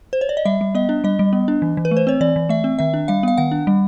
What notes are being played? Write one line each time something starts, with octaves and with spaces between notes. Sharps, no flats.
C5
C#5
D5
D#5
G3 E5
G3
B3 D#5
D4
G3 D#5
G3
B3
D4
E3
E3
B4
A3
C5
C4 C#5
E3 D5
E3
A3 E5
C4
D#3 E5
D4
G3 F5
B3 F5
D#3 F#5
D4
G3